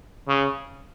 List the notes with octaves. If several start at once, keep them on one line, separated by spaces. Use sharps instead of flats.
C#3